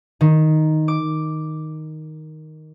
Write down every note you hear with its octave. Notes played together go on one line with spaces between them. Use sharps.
D#3
D6